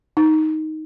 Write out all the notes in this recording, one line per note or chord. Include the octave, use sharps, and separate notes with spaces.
D#4